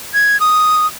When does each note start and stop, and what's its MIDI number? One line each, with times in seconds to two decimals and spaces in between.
0.14 0.39 92
0.40 0.87 87